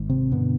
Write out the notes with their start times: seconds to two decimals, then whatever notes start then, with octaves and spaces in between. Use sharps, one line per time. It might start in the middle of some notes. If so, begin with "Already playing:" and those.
Already playing: G#1 G#2
0.09 C3 C4
0.32 G2 B2 D3 B3